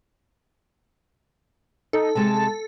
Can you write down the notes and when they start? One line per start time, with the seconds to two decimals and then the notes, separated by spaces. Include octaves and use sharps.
1.93 D#4 A4
2.15 C3 G#3 A5